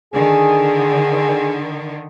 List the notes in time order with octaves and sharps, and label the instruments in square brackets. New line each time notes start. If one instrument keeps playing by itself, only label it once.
[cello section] D3 D#3 [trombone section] G#4